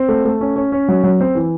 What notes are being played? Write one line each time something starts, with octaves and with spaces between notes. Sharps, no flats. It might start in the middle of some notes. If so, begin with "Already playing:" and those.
Already playing: C4
A3
A3
C#4
C#4
C#4
F#3
F#3
C4
E3